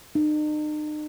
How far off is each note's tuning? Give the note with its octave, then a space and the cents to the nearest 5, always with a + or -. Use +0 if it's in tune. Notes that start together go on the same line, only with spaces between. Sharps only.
D#4 -45